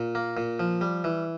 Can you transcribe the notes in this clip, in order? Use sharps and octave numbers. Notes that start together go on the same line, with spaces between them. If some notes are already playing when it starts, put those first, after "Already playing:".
Already playing: A#2
A#3
A#2
F3
G3
E3